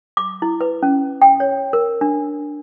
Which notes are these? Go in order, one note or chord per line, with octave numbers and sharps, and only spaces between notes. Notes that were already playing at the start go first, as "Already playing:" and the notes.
D6
E4
B4
C#4
G5
C#5
A#4
D4